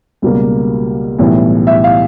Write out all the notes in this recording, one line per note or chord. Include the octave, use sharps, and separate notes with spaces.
C#2 B2 G3 A#3
B1 A2 E3 G3
E5
F5